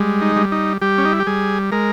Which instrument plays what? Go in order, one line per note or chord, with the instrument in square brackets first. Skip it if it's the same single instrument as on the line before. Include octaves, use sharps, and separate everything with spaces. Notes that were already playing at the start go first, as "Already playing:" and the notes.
Already playing: [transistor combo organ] G3 G#3
D#4
G3
D#4
G3 G4
C#4
D#4
E4
G4
G3 G#4
G#3 A#4